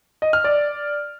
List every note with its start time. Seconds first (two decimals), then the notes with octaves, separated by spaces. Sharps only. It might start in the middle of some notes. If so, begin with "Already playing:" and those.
0.22 D#5
0.33 F6
0.44 D5